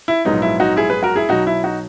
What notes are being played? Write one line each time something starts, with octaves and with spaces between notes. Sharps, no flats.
E4
A#1 G#2 F#3 B3 D#4
E4
D#4 F#4
E4 G#4
G#4 B4
F#4 A#4
E4 G#4
B1 B2 F#3 D#4 F#4
E4
D#4 F#4